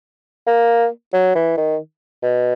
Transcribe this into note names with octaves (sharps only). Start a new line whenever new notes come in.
A#3
F#3
E3
D#3
B2